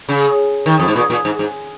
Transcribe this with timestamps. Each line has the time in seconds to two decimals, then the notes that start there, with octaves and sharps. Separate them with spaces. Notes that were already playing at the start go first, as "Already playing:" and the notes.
0.09 C#3
0.66 D#3
0.79 F2
0.88 G#2
0.96 A#2
1.10 A#2
1.25 G#2
1.39 G#2